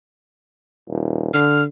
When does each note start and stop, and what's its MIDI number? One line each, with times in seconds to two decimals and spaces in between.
0.89 1.31 27
1.34 1.64 50
1.34 1.63 89